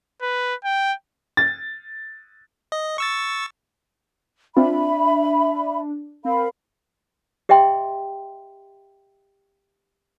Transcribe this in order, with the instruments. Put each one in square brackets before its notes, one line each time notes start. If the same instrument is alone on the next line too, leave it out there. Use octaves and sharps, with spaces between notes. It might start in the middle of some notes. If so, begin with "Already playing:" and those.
[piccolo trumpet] B4
G5
[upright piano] A6
[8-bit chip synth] D#5
C#6 E6 A6
[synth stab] C4 F4 [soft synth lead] D4 [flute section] E5 B5
[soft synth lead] C4 [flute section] A#4 F5 B5
[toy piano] G4 D#5 E5 G5 C6